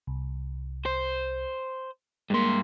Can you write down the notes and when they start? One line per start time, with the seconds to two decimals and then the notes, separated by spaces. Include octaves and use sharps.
0.07 C2
0.86 C5
2.30 G2 G#3 A#3 C6